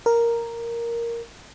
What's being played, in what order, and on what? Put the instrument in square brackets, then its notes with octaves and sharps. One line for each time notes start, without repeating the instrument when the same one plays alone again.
[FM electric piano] A#4